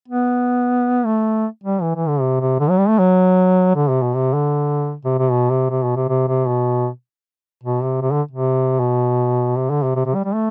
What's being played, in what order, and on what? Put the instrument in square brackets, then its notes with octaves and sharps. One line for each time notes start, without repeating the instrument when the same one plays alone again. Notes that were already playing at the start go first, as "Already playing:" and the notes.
[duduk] B3
A3
G3
E3
E3
D3
C3
C3
D3
F#3
G3
A3
F#3
D3
C3
B2
C3
D3
C3
C3
B2
C3
C3
B2
C3
C3
C3
B2
B2
C3
C3
D3
C3
B2
C3
D3
C3
C3
C3
G3
G3
A3